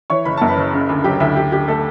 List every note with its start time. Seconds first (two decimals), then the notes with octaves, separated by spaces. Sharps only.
0.10 E3 C#5 C#6
0.25 F#1 B5
0.37 F#2 A5
0.49 B4 B5
0.57 F#1
0.73 C#3
0.89 D2
1.04 F#3 G4 G5
1.20 D2 E4 E5
1.36 D3 G4
1.52 D3 G4
1.68 A3 A4